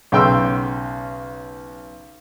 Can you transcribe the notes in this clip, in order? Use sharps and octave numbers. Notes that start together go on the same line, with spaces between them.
B1 C#3 G5 C6 E6